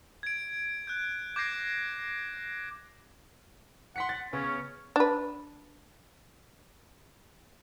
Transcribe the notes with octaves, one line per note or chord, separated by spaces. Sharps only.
G#6 D7
F#6 G6
D6 G6 G#6 A#6 C7 D7
F#5 C6 B6 C#7
A6
C#3 B3 C#4
D4 B4